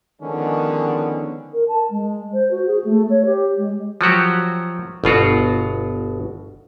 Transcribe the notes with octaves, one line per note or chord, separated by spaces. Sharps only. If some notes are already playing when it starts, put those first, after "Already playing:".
D3 D#3 F3 G#3 B3 C#4
A#4
A5
G#3
C5
F#4
G#4
A3
C#5
G4
G#3
F3 F#3 F#4 G4
G1 B2 F4 F#4